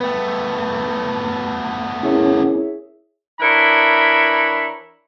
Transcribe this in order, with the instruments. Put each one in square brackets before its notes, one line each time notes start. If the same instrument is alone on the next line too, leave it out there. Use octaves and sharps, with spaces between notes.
[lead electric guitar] A3 B3 [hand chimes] B4 G5
[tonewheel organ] C#4 [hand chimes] E4 A#4 [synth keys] G#4 C#5 E5
[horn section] E3 D4 A#4 C#5 E5 B5